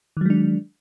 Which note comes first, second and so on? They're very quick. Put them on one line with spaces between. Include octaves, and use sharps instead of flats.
D#3 F#3 G#3 D4